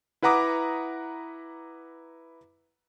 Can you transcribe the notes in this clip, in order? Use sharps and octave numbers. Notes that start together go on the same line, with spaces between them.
E4 B4 F#5 A#5 D6 D#6